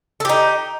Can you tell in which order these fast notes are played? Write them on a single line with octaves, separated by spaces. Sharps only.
A4 G4 D#4